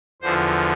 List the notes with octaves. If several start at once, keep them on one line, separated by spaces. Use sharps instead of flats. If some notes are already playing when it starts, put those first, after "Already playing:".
E2 D3 F3 C5